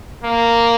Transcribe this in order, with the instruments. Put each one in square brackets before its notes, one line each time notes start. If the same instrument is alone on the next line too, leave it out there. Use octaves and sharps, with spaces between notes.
[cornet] A#3